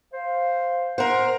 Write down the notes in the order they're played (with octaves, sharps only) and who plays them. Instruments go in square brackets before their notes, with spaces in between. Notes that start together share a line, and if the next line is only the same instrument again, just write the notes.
[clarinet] C5 [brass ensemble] F5
[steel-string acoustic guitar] A#4 C5 [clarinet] F#5